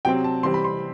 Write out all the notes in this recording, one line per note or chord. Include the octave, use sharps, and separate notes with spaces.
C3 F#3 C4 G5
A5
C3 E3 G3 C4 C6
B5
C6